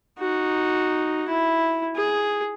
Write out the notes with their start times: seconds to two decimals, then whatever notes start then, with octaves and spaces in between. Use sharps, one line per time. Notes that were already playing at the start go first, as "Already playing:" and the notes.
0.19 D#4 F#4
1.28 E4
1.96 G#4